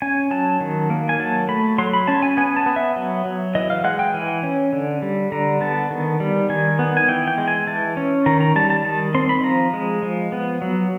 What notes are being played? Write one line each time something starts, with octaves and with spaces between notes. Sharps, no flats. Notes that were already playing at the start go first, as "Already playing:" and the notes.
C#4 G#5
F#3 A5
D#3
A#3
G#5
F#3 A5
A3 B5
F#3 C6
B5
C#4 A5
G#5
B3 G#5
A5
B3
E5
F#3
F#3
E3 D#5
F5
G#3 F#5
G5
E3 G#5
C#4
D3
G3
D3 A#5
B3 A5
D#3
G3
D#3 G#5
B3
G#5
E3 G5
G5
G#3
G#5
E3 A5
C#4
D#3 A#5
A#5
G3 A5
A5
D#3 A5
C4 C6
B5
F3 A#5
G#3
F3
B3
F#3